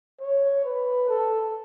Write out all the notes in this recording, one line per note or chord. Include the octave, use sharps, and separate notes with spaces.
C#5
B4
A4